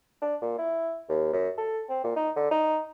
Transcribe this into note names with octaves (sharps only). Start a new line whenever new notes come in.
D4
A#2
E4
D#2
F#2
A4
C4
A#2
D#4
D3
D#4